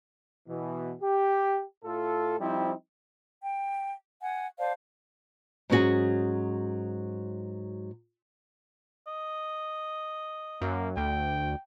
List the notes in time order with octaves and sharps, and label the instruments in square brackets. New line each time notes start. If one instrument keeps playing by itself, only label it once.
[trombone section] B2 E3
G4
A2 F4 A4
F3 G3 C4 D#4 E4
[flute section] G5
F#5 G#5
C5 D5 F5 A5
[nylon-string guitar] G#2 F#3 C#4 D4 F#4 G#4
[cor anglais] D#5
[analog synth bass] F#2 [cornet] A#3
[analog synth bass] D2 [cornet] G5